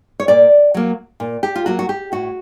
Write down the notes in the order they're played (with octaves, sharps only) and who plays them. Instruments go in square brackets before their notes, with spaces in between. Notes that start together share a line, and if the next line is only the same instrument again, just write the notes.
[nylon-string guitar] C#5
A#2 D5
F#3 A#3
A#2
G4
F4
F#3 A#3 F#4
F#4
G4
A2 F#4